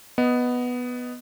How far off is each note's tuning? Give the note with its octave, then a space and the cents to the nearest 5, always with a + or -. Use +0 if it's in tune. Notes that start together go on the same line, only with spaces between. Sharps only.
B3 +0 D#5 +0